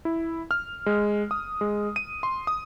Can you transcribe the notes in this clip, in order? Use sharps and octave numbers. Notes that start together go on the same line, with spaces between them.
E4
F6
G#3
D#6
G#3
D#7
C6
D#6